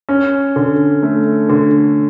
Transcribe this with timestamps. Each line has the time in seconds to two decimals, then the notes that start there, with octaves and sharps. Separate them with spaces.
0.09 C#4
0.56 D3
1.03 A3
1.49 D3